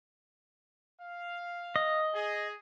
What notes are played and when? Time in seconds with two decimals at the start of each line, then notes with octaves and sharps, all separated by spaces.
1.00 F5
1.76 D#5
2.14 G#4